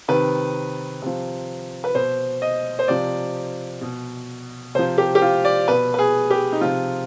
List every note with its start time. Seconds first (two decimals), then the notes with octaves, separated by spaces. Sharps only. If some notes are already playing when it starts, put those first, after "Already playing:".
0.08 C3 D#3 B4
1.02 C3 F3
1.84 B4
1.95 B2 C5
2.42 D#5
2.79 C5
2.88 C3 F3 D5
3.81 B2
4.75 C3 C5
4.79 F3
4.98 G4
5.15 G4
5.22 F4
5.45 D5
5.68 B2 B4
5.94 B4
5.99 G#4
6.30 G4
6.52 D#4
6.61 C3 F3 F4